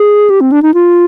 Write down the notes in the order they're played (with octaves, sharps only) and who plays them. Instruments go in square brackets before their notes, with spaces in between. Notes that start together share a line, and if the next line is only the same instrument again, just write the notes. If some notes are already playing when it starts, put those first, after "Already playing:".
Already playing: [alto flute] G#4
G4
C4
D4
D#4
F4